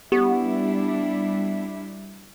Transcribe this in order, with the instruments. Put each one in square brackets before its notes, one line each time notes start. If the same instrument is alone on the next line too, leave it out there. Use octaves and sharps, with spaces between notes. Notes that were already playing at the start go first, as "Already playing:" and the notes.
[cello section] G3 D4 E4 [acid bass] B3 [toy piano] G4